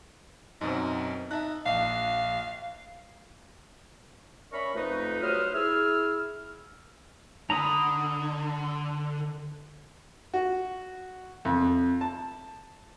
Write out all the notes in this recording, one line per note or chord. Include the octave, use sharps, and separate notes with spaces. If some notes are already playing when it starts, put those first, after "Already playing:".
F#2 B2 C4 D#4
D#4 E5 A5 F#6
A#1 F5
C#4 D4 A#4 E5 B5 C#6
F2 A3 D#4 B4
G2 F#3 B4 C5 D#6 F6
E4 G#4 E6 F6
D3 A#5 B5 D#6
F#4
F2
A5